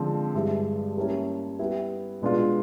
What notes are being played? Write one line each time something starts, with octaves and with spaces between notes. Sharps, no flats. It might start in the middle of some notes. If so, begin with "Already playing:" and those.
Already playing: D3 F3 G#3 C4
G2 E3 G#3
G3 A#3 C#4 E4
G3 B3 E4
B2 G#3 B3 D4 F4